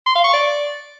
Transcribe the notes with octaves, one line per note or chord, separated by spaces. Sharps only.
C6
F5
C#6
D5